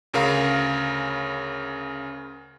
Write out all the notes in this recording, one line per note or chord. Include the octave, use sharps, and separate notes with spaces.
D2 C#3 A#4 F5